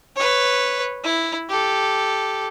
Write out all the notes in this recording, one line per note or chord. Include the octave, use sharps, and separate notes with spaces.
B4 C#5
E4
G4 A4